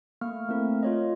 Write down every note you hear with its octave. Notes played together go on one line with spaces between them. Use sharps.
A3 A#3 C#6 F6
A3 C4 E4 A#4
F4 C#5 D#5